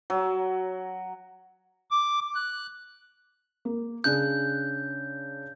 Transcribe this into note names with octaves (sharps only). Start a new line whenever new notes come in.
F#3
D6
F#6
A#3
C#3 D4 F#6 G6